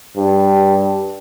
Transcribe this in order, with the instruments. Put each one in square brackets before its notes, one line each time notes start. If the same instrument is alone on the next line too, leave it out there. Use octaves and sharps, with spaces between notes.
[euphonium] G2